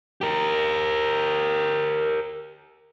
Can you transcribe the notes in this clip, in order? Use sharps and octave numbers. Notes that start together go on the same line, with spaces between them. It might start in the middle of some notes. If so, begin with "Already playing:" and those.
G4 A#4